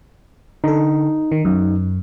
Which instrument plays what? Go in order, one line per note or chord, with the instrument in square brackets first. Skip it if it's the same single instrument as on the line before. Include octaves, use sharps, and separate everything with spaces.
[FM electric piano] D3 A4 [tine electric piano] D#4
[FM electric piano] D#3
F#2